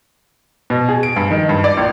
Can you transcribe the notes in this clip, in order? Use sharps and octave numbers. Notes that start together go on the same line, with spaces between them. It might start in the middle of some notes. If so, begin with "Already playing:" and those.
B2
G#4
D7
G2
D#3
G2
D5
A#1